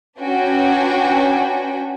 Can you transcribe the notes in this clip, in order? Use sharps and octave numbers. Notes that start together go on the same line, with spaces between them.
C#4 D4 F#4 B4 G5 G#5